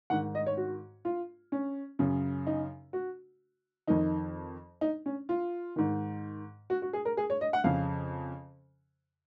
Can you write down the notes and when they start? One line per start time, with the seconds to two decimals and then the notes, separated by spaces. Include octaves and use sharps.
0.10 G#2 D#3 F#5
0.35 D#5
0.46 C#5
0.57 F#4
1.05 F4
1.52 C#4
1.99 F#2 C#3
2.47 D#4
2.93 F#4
3.88 F2 D#3 D#4
4.81 D#4
5.06 C#4
5.29 F4
5.76 G#2 D#3
6.70 F#4
6.82 F#4
6.93 G#4
7.05 A#4
7.17 G#4
7.30 C#5
7.41 D#5
7.53 F#5
7.64 F2 C#3 F5